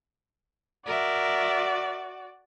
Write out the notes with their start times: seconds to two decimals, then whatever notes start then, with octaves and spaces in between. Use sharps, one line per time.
0.86 F#4 A#4 D5 E5